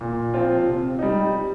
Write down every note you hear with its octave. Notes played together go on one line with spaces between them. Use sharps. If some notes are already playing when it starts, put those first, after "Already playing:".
A#2
F3 C4 F4
C3
G3 D#4